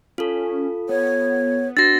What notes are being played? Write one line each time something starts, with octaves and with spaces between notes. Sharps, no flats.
C#4 F4 A4
B3 C#5
D4 F#4 A6 A#6